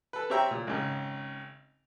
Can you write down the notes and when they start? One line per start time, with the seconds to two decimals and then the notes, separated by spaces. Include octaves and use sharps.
0.13 A4 B4
0.30 C4 G4 C#5 E5 G5 A#5
0.51 A#2
0.67 G#1 C#3